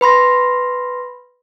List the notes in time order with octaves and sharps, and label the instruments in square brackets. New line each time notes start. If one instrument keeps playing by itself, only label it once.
[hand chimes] B4 B5 C6 A#6